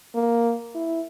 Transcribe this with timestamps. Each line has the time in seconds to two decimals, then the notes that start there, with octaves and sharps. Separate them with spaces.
0.15 A#3
0.75 E4